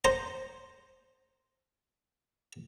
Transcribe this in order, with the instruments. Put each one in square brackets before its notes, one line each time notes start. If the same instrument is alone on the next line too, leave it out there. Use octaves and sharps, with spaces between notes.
[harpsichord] C5 A#5